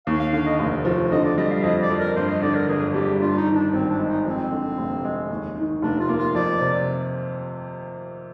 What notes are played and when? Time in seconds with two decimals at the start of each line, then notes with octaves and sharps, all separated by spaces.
0.07 D#2 F5
0.19 F5
0.33 D3 F5
0.46 D#5
0.59 F1
0.85 F3
1.12 D3 D#5
1.25 D5
1.38 G3 D#5
1.51 F5
1.63 F2 D#5
1.82 D5
1.90 F2
1.99 A#4
2.17 G2 C5
2.29 D#5
2.42 D3 D5
2.55 A#4
2.68 G1 G#4
2.94 G3 G4
3.20 G2 F4
3.38 D#4
3.47 D#3
3.55 D4
3.73 G#1 C4
3.90 D4
3.99 G#3
4.08 D#4
4.25 F2 C4
4.51 D3
4.78 F1
5.04 G#3
5.30 D#2
5.56 D#3
5.82 F1 D4
6.00 F4
6.09 A#3
6.17 F4
6.35 F2 D5
6.61 C3